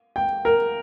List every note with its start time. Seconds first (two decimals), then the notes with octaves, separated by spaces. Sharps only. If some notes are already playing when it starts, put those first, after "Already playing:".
0.16 G5
0.45 A#4